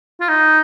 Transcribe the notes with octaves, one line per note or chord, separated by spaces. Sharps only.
F4
D#4